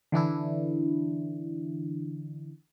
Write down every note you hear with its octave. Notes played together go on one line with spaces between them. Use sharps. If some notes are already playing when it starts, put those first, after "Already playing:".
D3 E3 D4 E4